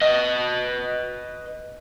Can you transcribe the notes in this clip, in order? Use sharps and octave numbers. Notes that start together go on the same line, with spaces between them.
B4 D#5